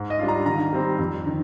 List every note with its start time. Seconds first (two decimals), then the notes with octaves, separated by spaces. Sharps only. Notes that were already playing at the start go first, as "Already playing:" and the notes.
Already playing: G#2
0.10 D#5
0.19 G3 D4 F4
0.28 A#5
0.46 D#3 A#5
0.73 G3 C4
0.99 F2
1.26 D#3